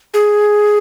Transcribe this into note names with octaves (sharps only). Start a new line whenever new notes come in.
G#4